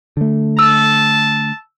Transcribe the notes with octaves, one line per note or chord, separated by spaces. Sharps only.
D3 A3
A5 E6